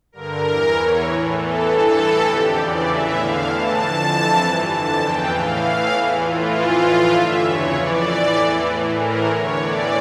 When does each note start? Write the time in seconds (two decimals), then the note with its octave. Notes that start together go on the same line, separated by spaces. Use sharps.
0.12 G2 D3 A#4
0.43 E2 E3
0.74 E2 E3 C#5
1.04 A2 E3
1.34 E2 E3 A4
1.64 G2 E3 A4
1.95 A2 E3 A4
2.25 F2 D3 G4
2.56 E2 C#3 E3 D5
2.87 A2 E3 E5
3.16 E2 D3 F5
3.47 A2 E3 A5
3.77 F2 D3
4.08 F2 E3
4.38 G2 E3
4.69 F2 D3 A5
4.99 E2 C#3 E3 G5
5.30 A2 E3 F5
5.60 A2 E3
5.92 E2 E3
6.21 A2 E3 F4
6.52 F2 E3
6.82 A2 E3 F4
7.12 G2 D3 E5
7.43 E2 C#3 E3 C#5
7.73 F2 E3 D5
8.05 A2 E3
8.34 E2 E3
8.65 A2 E3
8.96 A2 E3 A#4
9.26 E2 D3 C#5
9.56 A2 E3 D5